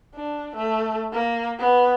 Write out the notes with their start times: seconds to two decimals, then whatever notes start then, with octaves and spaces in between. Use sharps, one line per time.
0.14 D4
0.56 A3
1.13 A#3
1.59 B3